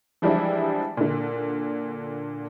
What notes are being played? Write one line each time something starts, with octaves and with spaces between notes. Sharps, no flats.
E3 F3 G3 G#3 D4 E4
A#2 D3